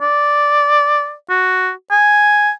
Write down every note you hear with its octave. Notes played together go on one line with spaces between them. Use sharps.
D5
F#4
G#5